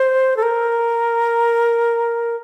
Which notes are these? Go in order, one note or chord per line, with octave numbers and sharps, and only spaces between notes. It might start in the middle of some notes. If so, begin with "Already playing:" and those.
Already playing: C5
A4
A#4